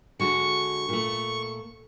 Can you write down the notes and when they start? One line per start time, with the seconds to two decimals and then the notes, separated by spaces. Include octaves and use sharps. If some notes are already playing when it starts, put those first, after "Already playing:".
0.20 D3 G#3 F#4 C#6
0.89 A#2 A3